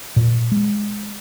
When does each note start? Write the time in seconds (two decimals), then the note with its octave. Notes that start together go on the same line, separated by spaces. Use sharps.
0.16 A#2
0.52 G#3